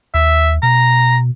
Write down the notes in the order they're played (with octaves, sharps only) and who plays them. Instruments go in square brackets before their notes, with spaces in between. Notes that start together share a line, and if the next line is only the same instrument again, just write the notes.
[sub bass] D#2 [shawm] E5
[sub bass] B2 [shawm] A#5